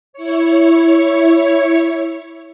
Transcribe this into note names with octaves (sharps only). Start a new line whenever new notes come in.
E4 C#5